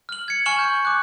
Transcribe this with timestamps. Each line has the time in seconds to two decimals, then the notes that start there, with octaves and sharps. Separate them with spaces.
0.09 F6 F#7
0.28 G#6 C#7
0.46 G#5 C#6 F6 C#7 E7 F#7
0.59 G6
0.85 D6 F#6